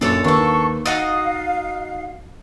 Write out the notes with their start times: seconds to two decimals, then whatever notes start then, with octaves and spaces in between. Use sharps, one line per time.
0.01 F#2 A#2 D4 A4 C#5
0.24 D#2 A#3 D4 A4 B4 C#6
0.86 D#4 F#4 D#5 F5 A6